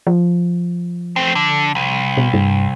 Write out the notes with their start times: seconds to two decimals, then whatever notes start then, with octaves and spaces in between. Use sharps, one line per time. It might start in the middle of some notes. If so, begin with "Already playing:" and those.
0.07 F3
1.16 A3 C4
1.35 D3
1.75 C2
2.17 B2
2.34 G2